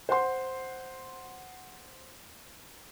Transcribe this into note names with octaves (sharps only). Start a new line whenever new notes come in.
C5 F#5 C6